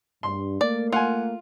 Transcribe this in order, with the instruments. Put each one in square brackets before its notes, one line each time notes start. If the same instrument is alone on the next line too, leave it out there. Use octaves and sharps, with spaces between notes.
[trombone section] G2 [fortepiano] C6
[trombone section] A3 A#3 [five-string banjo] D5
[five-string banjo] F4 [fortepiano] F#5 G#5